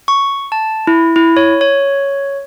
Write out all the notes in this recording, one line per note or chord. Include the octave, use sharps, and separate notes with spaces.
C#6
A5
E4
E4
C#5
C#5